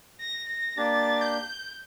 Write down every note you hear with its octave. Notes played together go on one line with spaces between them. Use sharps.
A#6
A#6
A#3 D4 G4 A6
G6